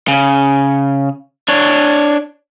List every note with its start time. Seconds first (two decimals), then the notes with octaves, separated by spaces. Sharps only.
0.08 C#3
1.48 D4 C#5